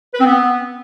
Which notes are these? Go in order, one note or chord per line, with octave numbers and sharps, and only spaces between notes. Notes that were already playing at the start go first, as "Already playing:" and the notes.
B4
C4
B3